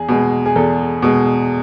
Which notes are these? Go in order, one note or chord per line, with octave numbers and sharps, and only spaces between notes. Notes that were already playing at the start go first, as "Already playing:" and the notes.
Already playing: E2 G#4
B2 G#3
G#4
E2 A4
B2 G#3